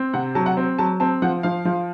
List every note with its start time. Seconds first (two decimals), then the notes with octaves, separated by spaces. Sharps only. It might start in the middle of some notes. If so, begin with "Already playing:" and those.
Already playing: C4
0.13 C3 F#5
0.35 F#3 A5
0.46 F#5
0.57 C4
0.78 F#3 A5
1.00 C4 A5
1.22 F3 F#5
1.43 F3 F5
1.65 F3